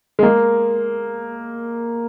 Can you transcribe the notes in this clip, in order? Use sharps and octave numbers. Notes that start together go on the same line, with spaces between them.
G#3
A#3